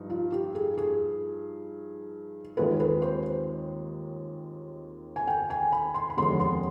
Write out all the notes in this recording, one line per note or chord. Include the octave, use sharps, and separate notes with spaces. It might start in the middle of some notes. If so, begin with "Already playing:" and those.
Already playing: G2 F3 D#4
F4
G4
G#4
G#4
D#2 D#3 G#3 C4 F4 B4
B4
C5
G#5
G5
G#5
B5
C6
B5
F1 D#2 D3 G#3 B3 C6
C6